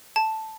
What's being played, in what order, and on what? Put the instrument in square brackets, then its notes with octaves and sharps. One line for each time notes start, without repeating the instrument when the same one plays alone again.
[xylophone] A5